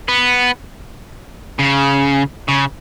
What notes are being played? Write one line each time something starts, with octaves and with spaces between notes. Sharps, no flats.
B3
C#3
C#3